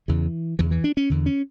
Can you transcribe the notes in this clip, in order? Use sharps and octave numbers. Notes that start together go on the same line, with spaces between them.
E2 C#3 E3
E2 C#3 E3
E3
D4
C#4
E2 D3
C#4